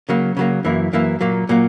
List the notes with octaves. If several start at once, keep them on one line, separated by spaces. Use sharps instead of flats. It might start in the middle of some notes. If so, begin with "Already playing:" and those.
C#3 F#3 A#3
C#3 F#3 A#3
F#2 E3 A#3 E4
F#2 E3 A#3 E4
A#2 F#3 A#3
A#2 F#3 A#3